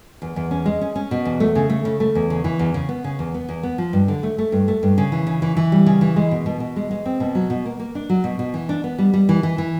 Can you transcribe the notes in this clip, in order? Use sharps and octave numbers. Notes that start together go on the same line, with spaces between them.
E2
E2
C#4
G#3
C#4
C#4
B2
E2
A3
C#3
A3
C#3
A3
E2
C#3
E3
E2
C#3
B3
C#3
E2
B3
E2
B3
F3
G2
D3
A3
A3
G2
A3
G2
C#3
E3
C#3
E3
E3
G3
C#3
E3
G#3
B2
B2
B2
G#3
G#3
C4
B2
F#3
B2
A#3
A#3
D4
F#3
B2
B2
E3
D4
B3
G3
G3
E3
E3
E3